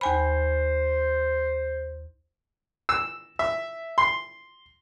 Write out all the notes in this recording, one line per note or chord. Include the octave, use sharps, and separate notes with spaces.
D#2 C5 G#5 B5
E6
E5
C6